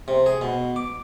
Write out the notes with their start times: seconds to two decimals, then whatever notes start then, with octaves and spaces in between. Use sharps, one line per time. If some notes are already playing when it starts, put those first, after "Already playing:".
0.08 C3
0.26 G#4
0.41 B2
0.76 D6